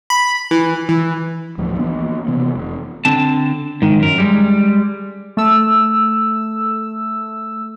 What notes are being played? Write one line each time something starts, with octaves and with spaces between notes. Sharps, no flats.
B5
E3
E3
A1 D2 F3 A3
E3 A#3 B3 D4
C3 E3 B3
F1
D3 C4 A5
G#2 D#3
F#2 A#4
G3 G#3
A3 E6